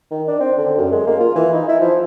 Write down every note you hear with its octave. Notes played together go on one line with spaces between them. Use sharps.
D#3
D4
C4
D3
F#2
G#3
A#3
F4
E3
D#4
E4
F3